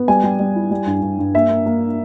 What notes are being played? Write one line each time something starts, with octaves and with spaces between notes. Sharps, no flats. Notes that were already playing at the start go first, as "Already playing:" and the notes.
Already playing: B3
G3 G#5
G3
G3
E4
G3
G2
G2
G2
A#3 E5
A#3
A#3